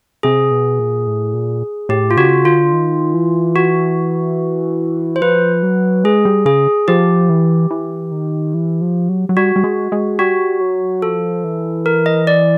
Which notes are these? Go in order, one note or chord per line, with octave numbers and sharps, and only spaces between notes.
C3 G#4
B2
A#2
A2
A#2
A2 G4
F4
C#3 F#4
D3 F4
D#3
E3
F#4
C5
F3 B4
F#3
G#3 G#4
G3
C#3 G#4
F3 G4
E3
E3
D#3
E3
F3
F#3
F#3
G3 F#4
G3
G#3
G#3
G3 F#4
F#3
F3 A4
E3
A#4
D#5
D5